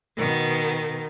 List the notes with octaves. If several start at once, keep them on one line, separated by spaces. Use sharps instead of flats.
B2 D#3